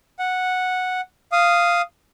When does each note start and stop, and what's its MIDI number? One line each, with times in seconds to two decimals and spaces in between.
0.19 1.01 78
1.32 1.82 77
1.32 1.82 87